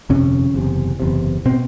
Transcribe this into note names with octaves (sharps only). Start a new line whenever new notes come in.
G1 F2 C3 C#4
F#1 E2 C3
F#1 E2 C3
B2 C4